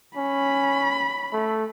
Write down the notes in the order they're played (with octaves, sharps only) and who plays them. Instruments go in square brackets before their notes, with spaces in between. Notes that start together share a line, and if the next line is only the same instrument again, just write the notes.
[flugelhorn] C#4 [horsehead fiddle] B5
[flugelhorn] A3